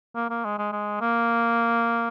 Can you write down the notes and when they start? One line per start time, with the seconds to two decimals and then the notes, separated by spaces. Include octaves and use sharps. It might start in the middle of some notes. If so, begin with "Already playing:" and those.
0.15 A#3
0.30 A#3
0.44 G#3
0.58 G#3
0.72 G#3
1.01 A#3